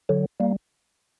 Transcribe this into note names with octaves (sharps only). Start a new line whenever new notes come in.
D3 F#3
G3 A#3